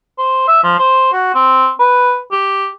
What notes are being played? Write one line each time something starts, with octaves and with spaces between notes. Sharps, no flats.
C5
E5
F3
C5
F#4
C4
B4
G4